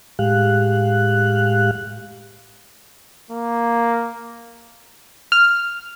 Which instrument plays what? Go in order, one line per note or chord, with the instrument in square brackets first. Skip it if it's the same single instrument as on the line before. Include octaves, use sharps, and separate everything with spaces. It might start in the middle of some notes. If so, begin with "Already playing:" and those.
[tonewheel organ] A2 G#3 G4 F5 F#6
[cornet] A#3
[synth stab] F6